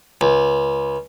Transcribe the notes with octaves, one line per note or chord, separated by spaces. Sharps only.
C#2